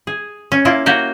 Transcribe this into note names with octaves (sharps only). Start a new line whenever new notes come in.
G#4
C#4
A#3 E4 F4
A#3 F#4 G4